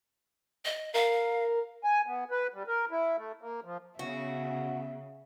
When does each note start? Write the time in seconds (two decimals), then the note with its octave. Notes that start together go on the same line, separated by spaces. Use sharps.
0.65 D#5
0.94 A#4 F5
1.84 G#5
2.07 B3
2.31 B4
2.54 G3
2.68 A#4
2.91 E4
3.17 A3
3.41 A#3
3.64 F3
3.99 C#3 B3 F#4 E5